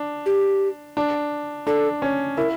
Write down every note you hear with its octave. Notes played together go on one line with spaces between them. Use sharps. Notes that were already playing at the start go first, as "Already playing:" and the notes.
Already playing: D4
G4
D4
D4 A4
C#4
E4 A#4